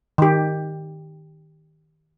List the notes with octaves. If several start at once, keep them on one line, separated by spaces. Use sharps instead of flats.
D#3 G4